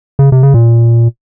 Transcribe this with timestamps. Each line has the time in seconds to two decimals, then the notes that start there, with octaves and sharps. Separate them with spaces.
0.19 C#3
0.32 C3
0.43 C#3
0.54 A#2